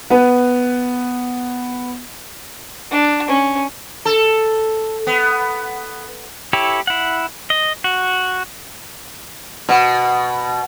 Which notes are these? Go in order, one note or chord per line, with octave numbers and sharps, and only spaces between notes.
B3 B4
D4
C#4
A4
B3
E4 G4 A4 C#5
E4 F#5
D#5
F#4
B2